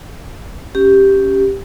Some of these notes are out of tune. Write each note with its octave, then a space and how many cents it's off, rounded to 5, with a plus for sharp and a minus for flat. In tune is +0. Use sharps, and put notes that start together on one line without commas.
C#4 +0 G4 +0